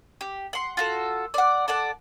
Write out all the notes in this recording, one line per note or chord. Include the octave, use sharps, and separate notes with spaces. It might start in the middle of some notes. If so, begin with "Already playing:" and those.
G4
F#5 C6
F4 F#4 A4
D5 F#5
A4 D5 F#5 A5